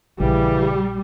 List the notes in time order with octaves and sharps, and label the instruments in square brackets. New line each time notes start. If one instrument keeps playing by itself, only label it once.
[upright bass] A#1 [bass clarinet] C#3 [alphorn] E3 [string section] G3